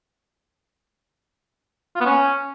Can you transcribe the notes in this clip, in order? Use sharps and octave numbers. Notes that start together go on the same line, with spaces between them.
F4
B3
C#4